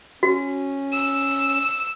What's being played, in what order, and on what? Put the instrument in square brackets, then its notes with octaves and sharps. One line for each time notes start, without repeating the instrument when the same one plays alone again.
[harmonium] C#4 [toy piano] F#4
[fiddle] E6